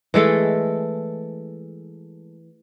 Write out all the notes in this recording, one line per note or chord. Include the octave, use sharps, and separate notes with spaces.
E3 G#3 A3 A4